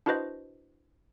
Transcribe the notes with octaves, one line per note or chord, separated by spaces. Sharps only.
D4 E4 F#4 B4 C5 D#5